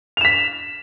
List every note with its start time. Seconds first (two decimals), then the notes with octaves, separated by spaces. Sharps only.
0.17 F7
0.21 E7
0.25 B6